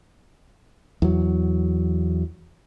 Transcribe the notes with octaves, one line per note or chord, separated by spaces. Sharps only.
E2 F#3